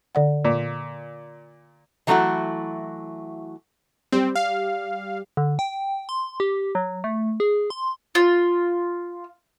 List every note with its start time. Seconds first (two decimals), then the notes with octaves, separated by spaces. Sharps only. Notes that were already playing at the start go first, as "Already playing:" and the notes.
0.15 D3 D5 F#5
0.45 A#2
2.07 E3 F#3 A3 B3 E4 F#4
4.12 G3 C4
4.36 F5
5.37 D3
5.59 G5
6.09 C6
6.40 G4
6.75 F#3
7.04 A3
7.40 G#4
7.70 C6
8.15 F4